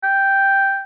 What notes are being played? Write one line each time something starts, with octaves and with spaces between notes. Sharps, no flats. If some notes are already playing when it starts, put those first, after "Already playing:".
G5